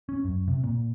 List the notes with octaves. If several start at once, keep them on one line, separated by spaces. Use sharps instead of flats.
C#4
F#2
C3
A#2